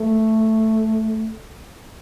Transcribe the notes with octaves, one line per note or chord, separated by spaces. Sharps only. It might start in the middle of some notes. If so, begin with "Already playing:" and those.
Already playing: A3